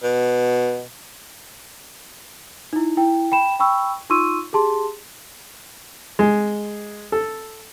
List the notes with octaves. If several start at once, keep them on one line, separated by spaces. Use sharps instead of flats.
B2
D#4 E4
E4 G5
G5 B5 E7
G5 B5 C#6 E6
D#4 F4 C6 C#6 E6 D#7
G4 G#4 A5 C6
G#3
A4